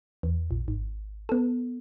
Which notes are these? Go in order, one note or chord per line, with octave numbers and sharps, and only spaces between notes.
E2
A#1
G#1
B3 A4